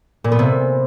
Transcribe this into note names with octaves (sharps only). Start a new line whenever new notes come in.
A#2
B3
C3